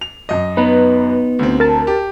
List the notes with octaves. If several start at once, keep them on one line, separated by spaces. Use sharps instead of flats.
F7
F#2 D#5
B3 D#4 B4
D2 C4
A#4 A5
G4